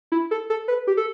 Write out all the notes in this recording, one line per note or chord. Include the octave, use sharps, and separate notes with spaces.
E4
A4
A4
B4
G4
A4